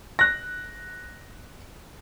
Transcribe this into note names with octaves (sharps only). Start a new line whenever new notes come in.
F#6 A#6